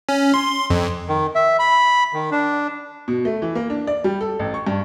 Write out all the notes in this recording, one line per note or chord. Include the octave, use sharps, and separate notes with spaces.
C#4
C6
F2
D#3
E5
B5
D#3
D4
B2
A3
E3
A#3
D4
D5
G3
A4
A1
C#6
G2